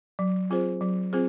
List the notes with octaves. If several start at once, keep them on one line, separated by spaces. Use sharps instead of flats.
F#3
C4 F4 G#4 C5
F#3
C4 F4 G#4 C5